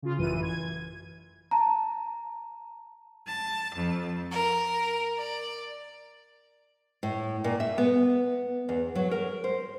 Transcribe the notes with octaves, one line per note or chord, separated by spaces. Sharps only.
C#3 F4
A1 F#2 E3 D#7
G#6
A5 A#5
A5
F2
A#4
D5
A2
A#2
E5
B3
E2
F#3
A#4
C5